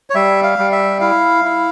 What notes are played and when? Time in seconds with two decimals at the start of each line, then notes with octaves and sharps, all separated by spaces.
0.10 C#5
0.15 G3 E5
0.43 F5
0.58 G3
0.72 E5
1.01 E4 F5
1.44 E4